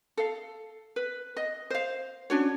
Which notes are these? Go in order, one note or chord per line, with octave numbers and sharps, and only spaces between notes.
A4 F5
B4
D#5
C5 F5
C#4 D4 F#4 C#5